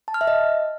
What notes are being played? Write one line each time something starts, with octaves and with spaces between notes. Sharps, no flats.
A5
F6
E5
D#5